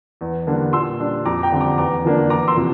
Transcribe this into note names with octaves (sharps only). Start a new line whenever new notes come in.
E2
D3 G3 A#3 D4
A#2 C6 E6
G3 D4
F2 A#5 D6
G5 A#5
D3 G3 C4
A#5 D6
E2 A#5 D6
D3 F3 A#3 D4
E2 A#5 D6
C6 E6
C3 F3